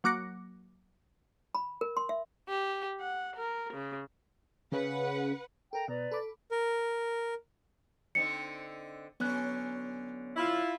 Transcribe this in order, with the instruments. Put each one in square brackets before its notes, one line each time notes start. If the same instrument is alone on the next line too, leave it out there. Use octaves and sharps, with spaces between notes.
[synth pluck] F#3 A#3 D6 F#6 A#6 C#7
[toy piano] B5
A#4
C6
E5
[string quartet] G4
F#5
A#4
C#3
[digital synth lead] C#3 [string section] B4 F#5
[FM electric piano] A4 A#4 [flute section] G5 A#5
[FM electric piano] B2 [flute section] B4 D5 A#5
[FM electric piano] A4 B5 D6
[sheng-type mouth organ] A#4
[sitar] D3 C4 D#4 [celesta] C#7
[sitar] D3 F#3 C#4 [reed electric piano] B3 F#6
[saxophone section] E4 F4